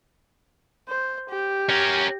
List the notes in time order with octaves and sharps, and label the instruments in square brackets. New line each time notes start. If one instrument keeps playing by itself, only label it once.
[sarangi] C5
G4
[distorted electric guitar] C#4 A#4